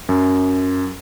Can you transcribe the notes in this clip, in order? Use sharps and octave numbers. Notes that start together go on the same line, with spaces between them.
F#2